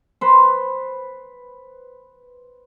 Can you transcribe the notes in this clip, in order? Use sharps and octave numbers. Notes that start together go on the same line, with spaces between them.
B4 C5